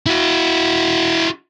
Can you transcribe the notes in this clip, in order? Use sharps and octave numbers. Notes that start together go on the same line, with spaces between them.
E4 F#4